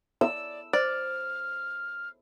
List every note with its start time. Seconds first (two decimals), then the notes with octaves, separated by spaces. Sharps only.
0.21 D5 E6
0.73 C5 D5 F6